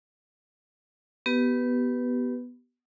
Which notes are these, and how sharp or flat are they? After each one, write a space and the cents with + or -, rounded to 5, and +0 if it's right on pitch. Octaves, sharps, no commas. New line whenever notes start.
B3 +0 G4 -25 B4 +0